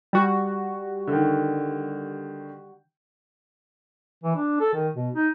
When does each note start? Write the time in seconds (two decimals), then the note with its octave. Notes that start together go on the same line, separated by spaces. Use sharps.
0.13 G3 F#4
1.07 D3 D#3
4.24 E3
4.36 D4
4.60 A4
4.74 D#3
4.95 B2
5.14 D#4